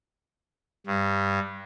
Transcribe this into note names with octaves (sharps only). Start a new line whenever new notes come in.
G2